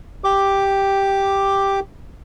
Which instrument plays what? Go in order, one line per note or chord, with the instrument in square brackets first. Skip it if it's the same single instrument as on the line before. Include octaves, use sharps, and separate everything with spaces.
[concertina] G4 D6